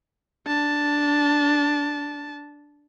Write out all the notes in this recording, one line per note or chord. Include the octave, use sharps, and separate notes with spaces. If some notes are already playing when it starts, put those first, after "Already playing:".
D4 A5